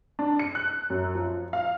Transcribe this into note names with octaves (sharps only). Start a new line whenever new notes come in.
D4
C#7
F#6
F#2
F3
F5